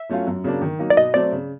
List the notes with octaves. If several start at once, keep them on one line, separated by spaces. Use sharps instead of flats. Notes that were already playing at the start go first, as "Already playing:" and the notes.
Already playing: E5
F#3 A3 C#4 F4
F#2
C#3 F#3 A#3 D4
D#3
F#3 A#3 D#4
D5
B2 D#5
F#3 A3 C4 D5
C#3